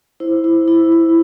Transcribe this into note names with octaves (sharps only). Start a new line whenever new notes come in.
E4 C5
E4
E4
E4